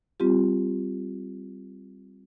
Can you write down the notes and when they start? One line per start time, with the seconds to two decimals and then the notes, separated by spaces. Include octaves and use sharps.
0.20 G3 C4 F4 G4